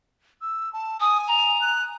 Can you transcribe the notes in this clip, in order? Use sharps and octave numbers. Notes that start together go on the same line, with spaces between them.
E6
A5
G#5 D#6
A#5
F#6